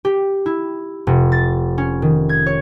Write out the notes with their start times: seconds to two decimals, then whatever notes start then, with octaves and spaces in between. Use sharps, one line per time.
0.05 G4
0.46 E4
1.07 F1
1.32 A6
1.78 C#4
2.02 D#3
2.29 G#6
2.46 C#5